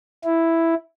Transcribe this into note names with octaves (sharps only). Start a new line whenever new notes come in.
E4